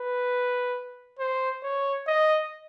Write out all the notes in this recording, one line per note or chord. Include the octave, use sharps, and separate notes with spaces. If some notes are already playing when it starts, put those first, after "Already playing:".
Already playing: B4
C5
C#5
D#5